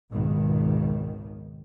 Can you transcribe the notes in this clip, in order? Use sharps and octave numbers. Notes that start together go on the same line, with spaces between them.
G#1 C#2 B2 D#3